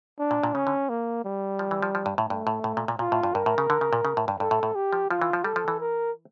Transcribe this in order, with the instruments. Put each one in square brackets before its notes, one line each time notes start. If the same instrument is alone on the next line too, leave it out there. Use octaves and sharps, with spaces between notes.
[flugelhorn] D4
[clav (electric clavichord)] A#2
A#2
[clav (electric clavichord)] C#3 [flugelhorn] C#4
[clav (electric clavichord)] D3
[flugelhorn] A#3
G3
[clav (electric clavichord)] F3
E3
F3
F3
G2
A2
[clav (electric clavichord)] G2 [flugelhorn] A3
[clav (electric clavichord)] A2
A2
A#2
A#2
[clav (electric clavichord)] A#2 [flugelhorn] F4
[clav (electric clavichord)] A2
G2
[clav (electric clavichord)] G2 [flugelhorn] A#4
[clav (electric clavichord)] A2
C#3
D3
C#3
A#2
C#3
A2
G2
[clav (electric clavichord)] G2 [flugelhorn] A4
[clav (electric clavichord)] A2
A2
[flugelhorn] G4
[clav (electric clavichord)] F3
[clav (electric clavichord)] F3 [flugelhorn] F4
[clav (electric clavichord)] E3
F3
[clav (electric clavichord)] G3 [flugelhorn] A4
[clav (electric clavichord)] F3
E3
[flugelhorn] A#4